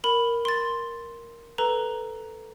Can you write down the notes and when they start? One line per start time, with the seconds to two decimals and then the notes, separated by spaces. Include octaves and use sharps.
0.04 A#4 B5
0.45 C6 A6
1.58 A4 B4 A#5